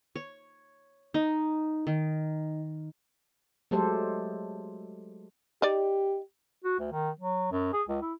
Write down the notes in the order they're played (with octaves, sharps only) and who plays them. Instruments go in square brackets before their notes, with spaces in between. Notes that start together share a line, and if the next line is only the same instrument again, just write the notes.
[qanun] C#5
D#4
D#3
[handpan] F#3 G#3 A3 G4 A4 C5
[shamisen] D#4 D5 [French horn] G4
[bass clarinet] F#4
D2
D#3
F#3
F#2
G#4
C#2
E4